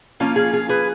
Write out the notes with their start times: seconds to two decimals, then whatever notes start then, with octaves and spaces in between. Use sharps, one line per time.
0.20 F3 A#3 C#4 F4
0.36 F4 G#4
0.53 F4 G#4
0.69 G#4 B4